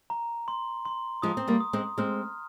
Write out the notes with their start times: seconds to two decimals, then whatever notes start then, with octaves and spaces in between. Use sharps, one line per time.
0.10 A#5
0.48 C6
0.85 C6
1.22 F3 G#3 D#6
1.37 C4
1.48 G3 A#3
1.60 D#6
1.73 G#3 C4
1.98 G#3 C4 F6